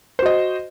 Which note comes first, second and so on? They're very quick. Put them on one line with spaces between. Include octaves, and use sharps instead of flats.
C5 F#4 D#5